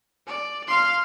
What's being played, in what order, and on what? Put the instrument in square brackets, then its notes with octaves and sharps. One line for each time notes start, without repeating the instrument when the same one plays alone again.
[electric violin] D5
F5 C6